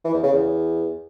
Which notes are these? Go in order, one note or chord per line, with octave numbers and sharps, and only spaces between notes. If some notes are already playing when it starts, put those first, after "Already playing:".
E3
E2
C#3
E2